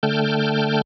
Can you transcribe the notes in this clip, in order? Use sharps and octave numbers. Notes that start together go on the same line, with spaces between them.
D3 A3 G5 A5 F6 G6